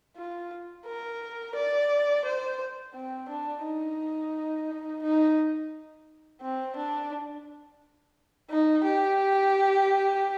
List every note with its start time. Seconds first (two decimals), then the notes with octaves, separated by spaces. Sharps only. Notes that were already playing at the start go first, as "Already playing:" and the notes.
0.16 F4
0.86 A#4
1.55 D5
2.25 C5
2.94 C4
3.29 D4
3.63 D#4
5.02 D#4
6.41 C4
6.76 D4
8.50 D#4
8.84 G4